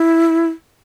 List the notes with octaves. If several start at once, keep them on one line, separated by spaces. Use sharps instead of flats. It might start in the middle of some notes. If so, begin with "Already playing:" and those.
Already playing: E4